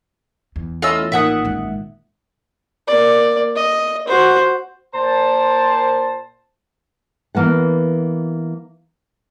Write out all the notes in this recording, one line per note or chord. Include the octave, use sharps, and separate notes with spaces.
E2
A3 C#4 E4 F4 D#5 E6
A1 A#2 D#3 E5 F#5 D#6
F#2 G#3
A#3 D5
D#5
F#4 C5
A#2 C5 A5
E3 A#3 B3 F#5